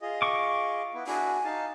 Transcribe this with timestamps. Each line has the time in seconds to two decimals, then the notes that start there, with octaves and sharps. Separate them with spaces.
0.01 F4 G#4 D#5
0.22 C#6 D6
0.94 B3 E4
1.07 D4 E4 F#4 G#5
1.45 D#4 F5 A5